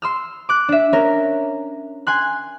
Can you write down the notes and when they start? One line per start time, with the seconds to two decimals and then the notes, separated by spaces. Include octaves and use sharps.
0.02 C6 E6 F6
0.49 D6 F#6
0.69 D4 E5
0.93 C#4 A#4
2.07 G#5 C6 F#6